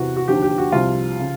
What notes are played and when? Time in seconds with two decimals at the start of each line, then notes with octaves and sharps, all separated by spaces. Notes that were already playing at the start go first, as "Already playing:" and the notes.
Already playing: E2 C3 E3 F#4
0.17 F#4
0.28 D#2 D3 F3 G4
0.42 G4
0.58 F#4
0.72 C2 C3 F3 F4
1.20 C#3